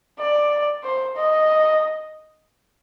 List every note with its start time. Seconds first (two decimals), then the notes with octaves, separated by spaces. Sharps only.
0.19 D5
0.84 C5
1.16 D#5